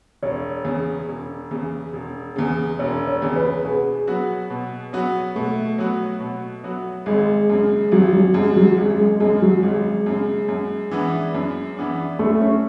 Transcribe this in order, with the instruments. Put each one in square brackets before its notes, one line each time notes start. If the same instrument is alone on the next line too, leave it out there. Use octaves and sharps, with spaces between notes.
[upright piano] E1 [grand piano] C#5
[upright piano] E2 C#3
E1
E2 C#3
E1
E2 C#3
[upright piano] E1 [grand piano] C#5
[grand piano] C#5
[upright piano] E2 C#3
[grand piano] B4
[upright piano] B2 [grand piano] G#4
[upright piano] F#3 B3 F#4
B2
F#3 B3 F#4
[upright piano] B2 [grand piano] A3
[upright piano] F#3 B3 F#4
B2
F#3 B3 F#4
[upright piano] G#1 [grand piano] G#3
[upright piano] F#2 C#3
[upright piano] G#1 [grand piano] F#3
[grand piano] F#3
[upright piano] F#2 C#3 [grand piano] G#3
[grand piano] F#3
[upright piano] G#1 [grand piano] G#3
[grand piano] G#3
[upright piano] F#2 C#3 [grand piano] G#3
[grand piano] F#3
[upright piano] G#1 [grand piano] G#3
[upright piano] F#2 C#3
F#2
E3 B3 D4
F#2
E3 B3 D4
[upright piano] F#2 [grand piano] A3
[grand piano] C#4